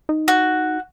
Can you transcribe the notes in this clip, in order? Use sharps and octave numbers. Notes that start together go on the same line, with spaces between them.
D#4
F#4